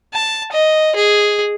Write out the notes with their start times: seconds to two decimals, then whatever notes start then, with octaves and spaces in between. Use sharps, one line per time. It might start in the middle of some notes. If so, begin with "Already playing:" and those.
0.14 A5
0.52 D#5
0.96 G#4